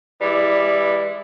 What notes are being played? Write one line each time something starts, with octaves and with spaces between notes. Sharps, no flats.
E3 G3 G#3 E4 D5